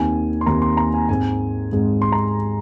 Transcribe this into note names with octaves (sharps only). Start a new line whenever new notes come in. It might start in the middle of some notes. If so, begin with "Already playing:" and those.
Already playing: D#2 D#3 C4 G#5
C6
D#2 D#3 C4 A#5
C6
A#5
G#5
G#2 G#3 C4 G#5
G#2 G#3 C4
C6
A#5